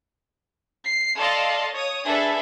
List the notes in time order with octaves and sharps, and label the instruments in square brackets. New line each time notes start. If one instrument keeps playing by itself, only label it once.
[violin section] C7
A4 D5 D#5 F5 A5 C6
C#5 D#6
D4 G#4 A4 B4 E5